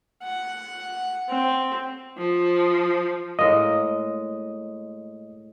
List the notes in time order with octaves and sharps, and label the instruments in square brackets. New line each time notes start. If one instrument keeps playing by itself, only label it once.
[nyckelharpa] F#5
C4
[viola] F3
[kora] A2 G#3 A#3 [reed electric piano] D#5